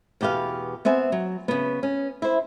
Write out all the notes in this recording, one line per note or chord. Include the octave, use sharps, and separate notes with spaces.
E2 B2 G4 B4 F5
B3 C4 E5 G#5
F#3
C#3 B3
C#4
E4 C5